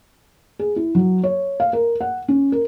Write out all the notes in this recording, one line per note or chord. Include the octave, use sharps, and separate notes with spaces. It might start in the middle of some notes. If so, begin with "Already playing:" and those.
G#4
E4
F#3
C#5
F5
A#4
F#5
C#4
A#4